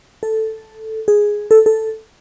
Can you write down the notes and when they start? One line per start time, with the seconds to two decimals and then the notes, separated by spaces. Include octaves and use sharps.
0.23 A4
1.08 G#4
1.51 A4
1.66 A4